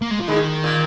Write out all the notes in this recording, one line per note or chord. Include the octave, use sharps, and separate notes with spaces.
A#3
G#3
F3
G#2 D#3 G#3
A#2 A#3